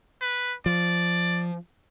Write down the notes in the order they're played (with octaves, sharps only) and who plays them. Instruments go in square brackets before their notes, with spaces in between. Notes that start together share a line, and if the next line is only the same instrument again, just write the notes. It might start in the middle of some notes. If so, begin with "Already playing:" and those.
[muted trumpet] B4
[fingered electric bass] F3 [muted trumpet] D5